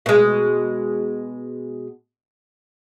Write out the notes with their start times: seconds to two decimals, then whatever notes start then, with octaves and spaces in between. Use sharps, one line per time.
0.06 B2 G#3